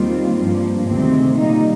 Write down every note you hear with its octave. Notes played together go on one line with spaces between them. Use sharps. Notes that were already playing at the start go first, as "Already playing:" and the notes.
Already playing: D#2 D#3 G3 C4 F4
G2 F3 A#3
D2 C3 D#3 G#3 C4
A#2 G3 A#3 D#4